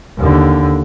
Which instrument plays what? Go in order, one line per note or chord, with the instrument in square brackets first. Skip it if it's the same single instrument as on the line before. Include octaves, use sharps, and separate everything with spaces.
[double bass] D#2 D3